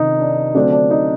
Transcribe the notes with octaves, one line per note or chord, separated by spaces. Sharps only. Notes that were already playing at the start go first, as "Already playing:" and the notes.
Already playing: C3 D#3 D#4
D4
D3 F#3 A3 C4 D4
D4
D#4